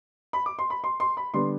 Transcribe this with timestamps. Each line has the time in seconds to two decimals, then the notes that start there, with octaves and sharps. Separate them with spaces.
0.33 B5
0.46 D6
0.59 C6
0.70 B5
0.84 C6
1.00 C6
1.17 B5
1.34 D3 G3 B3 C6